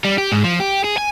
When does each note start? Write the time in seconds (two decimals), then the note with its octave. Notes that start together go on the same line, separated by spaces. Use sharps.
0.04 G3
0.18 G4
0.32 G#2
0.44 F3
0.60 G4
0.84 G#4
0.97 G#5